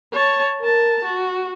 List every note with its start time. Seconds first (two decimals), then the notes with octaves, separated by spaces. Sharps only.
0.13 C#5 A5
0.60 A#4 A5
1.04 F#4